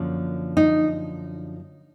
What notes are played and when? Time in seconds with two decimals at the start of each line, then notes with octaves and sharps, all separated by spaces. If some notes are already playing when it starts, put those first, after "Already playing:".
Already playing: F#2 D3 F3 A#3 C#4
0.57 D#4